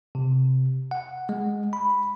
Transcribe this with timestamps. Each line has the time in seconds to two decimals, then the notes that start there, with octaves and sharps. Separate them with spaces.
0.15 C3
0.91 F#5
1.29 G#3
1.73 B5